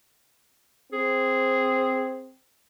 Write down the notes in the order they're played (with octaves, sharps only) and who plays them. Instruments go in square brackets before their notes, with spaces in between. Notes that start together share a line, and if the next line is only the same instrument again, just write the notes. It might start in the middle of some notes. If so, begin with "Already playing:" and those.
[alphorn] C4 [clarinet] G#4